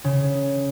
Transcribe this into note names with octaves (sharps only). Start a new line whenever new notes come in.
C#3